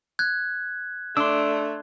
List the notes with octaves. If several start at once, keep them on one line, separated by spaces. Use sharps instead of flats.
F#6 G#6
A3 D4 C6 E6